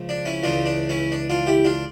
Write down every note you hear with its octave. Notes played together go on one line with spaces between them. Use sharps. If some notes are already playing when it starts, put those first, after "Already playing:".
Already playing: C#2 C#3 F3
D4
C#4 E4
C#2 C#3 E3 D4 F4
D4
C#4 E4
D4
D4 F4
E4 G4
D4 F4